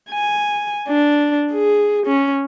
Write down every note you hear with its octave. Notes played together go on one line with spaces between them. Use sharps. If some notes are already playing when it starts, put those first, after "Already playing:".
G#5
D4
G#4
C#4